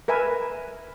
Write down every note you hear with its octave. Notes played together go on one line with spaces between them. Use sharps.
A#4 B4 E5 G#5